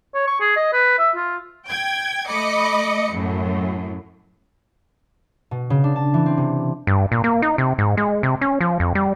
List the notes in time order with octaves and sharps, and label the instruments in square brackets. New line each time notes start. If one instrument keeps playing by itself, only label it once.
[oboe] C#5
C#6
G#4
D#5
B4
E5
F4
[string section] G5 G#6
A3 D#5 B5 D6 C#7
F#2 A2
[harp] B2
C#3
D4
A5
E3
C4
C3
[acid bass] G2
A#2
A#3
D#4
C3
G#2
G#3
C3
C#4
F3
F2
G3